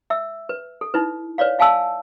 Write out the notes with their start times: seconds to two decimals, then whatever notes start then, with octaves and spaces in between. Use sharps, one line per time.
0.10 E5 E6
0.49 B4
0.81 A4
0.94 D#4 E4 B4
1.38 B4 C#5 D5 F5
1.59 E5 F5 G#5 A5 E6